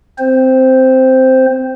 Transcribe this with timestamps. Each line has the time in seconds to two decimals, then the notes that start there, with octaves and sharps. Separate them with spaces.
0.18 C4 C5